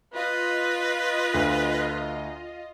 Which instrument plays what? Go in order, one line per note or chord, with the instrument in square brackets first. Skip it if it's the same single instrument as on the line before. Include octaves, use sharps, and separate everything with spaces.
[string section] F4 D#5 [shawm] B4
[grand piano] D2